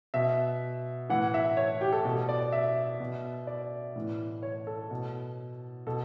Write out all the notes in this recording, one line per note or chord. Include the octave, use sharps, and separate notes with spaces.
B2 E5
A2 E3 F#5
E5
C#5
G4
A4
B2
D5
E5
B2
D5
A2 E3
C#5
A4
B2
B2 A4